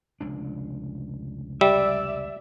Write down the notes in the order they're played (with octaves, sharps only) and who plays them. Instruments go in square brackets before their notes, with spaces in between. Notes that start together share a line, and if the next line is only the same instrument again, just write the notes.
[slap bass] F1 C#2 D4
[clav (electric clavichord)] G3 [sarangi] D5 [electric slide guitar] E5